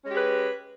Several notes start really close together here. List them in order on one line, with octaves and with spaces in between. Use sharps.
C#4 G#3 G4 G#4 B4